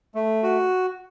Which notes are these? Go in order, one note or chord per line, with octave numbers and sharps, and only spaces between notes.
A3
F#4